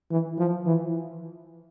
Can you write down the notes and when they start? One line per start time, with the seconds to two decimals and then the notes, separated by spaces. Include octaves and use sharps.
0.11 E3
0.38 F3
0.66 E3